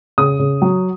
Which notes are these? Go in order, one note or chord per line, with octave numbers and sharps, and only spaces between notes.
C#3 D#6
C#3
F#3